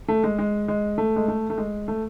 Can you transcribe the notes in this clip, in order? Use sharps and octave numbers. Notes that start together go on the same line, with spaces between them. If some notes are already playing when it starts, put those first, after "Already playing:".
A3
G#3
G#3
G#3
A3
G#3
A3
A3
G#3
A3